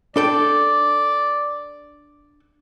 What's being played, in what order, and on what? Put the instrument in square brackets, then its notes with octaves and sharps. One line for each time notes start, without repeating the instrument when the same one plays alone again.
[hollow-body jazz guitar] D4 A4 G5 [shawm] D5